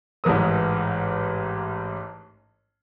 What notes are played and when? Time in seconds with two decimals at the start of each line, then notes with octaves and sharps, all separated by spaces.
0.24 A1 G#2 E3 A#4 D#6